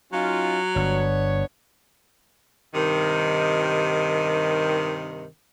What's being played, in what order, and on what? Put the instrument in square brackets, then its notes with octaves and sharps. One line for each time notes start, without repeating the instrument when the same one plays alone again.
[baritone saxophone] F#3 [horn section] C#4 D#4 F4
[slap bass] G1 [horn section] B3 D4 C#5
[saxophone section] G2 C3 D#3